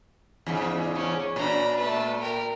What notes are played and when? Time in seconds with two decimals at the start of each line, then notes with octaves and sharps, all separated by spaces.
0.46 E2 G#2 C#3
0.95 C#4 D4
1.36 A#2 D4 A#5 B5
1.77 A3 B4
2.20 A#4 G5